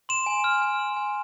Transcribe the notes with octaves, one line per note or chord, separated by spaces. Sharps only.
C6 E7
G#5
F6
G#5
C6
G#5